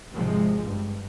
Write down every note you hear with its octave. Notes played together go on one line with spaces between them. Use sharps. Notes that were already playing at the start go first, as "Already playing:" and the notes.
G#1 C3 F3 G#3
G2